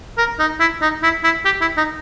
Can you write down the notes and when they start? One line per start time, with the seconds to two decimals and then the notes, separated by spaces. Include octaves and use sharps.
0.18 A#4
0.39 D#4
0.60 E4
0.82 D#4
1.03 E4
1.24 E4
1.45 G4
1.61 E4
1.77 D#4